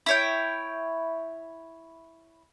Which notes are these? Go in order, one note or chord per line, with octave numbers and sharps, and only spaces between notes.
E4 C#5 G5